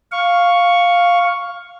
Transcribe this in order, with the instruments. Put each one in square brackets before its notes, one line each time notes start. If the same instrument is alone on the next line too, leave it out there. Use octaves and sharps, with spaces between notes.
[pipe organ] F5 C#6